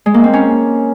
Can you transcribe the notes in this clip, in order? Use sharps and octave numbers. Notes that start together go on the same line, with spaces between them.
G#3
A#3
C4
C#4